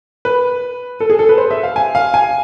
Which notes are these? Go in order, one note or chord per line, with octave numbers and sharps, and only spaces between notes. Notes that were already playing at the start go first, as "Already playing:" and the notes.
B4
A4
G#4
A4
B4
C5
E5
F5
G#5
F5
G#5